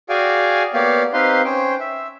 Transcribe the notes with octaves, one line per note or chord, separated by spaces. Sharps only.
F#4 G#4 D5 F5 G5 G#5
A#3 B3 G4 C#5 D5 F5
C4 D#4 G4 B4 F5 C6
C#4 C5 G5
E5